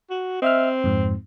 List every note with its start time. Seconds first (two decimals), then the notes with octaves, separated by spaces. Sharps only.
0.10 F#4
0.42 C4 D#5 E5 F6
0.84 F2 G#2